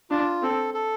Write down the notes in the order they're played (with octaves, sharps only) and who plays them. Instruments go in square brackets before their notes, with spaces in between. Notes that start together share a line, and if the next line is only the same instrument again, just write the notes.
[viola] D4 [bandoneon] F4
[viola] C4 [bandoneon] A4
[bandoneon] A4